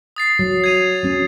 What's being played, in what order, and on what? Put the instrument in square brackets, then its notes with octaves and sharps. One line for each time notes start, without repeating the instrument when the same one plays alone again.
[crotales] D#6 A6 C7
[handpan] F#3
[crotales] G#6 D#7 F7
[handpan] F#3 C#4